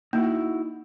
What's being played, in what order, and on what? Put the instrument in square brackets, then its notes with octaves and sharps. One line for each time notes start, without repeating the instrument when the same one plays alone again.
[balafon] A#3 [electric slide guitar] D#4 E4 F#4